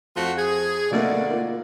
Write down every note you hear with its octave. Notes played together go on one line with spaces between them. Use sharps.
F2 A3 F4 F#4
G#4
D2 B2 A3 A#3 F#4 D5
A#3 F4